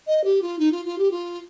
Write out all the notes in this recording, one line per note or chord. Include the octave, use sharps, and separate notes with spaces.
D#5
G4
F4
D#4
F4
F4
G4
F4